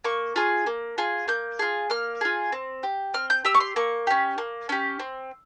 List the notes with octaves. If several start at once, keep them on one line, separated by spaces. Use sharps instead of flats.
A#3 C#6
F4 G#4
A#3
F4 G#4
A#3 G6
F4 G#4
A#3 F6
F4 G#4
C4
G4
C4 F6
G6
G4 E6
C#6
C6
A#3 C#6
C#4 G4
A#3
C#4 G4
C4